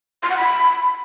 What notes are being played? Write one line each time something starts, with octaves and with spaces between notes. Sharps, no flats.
C6
F#5
B5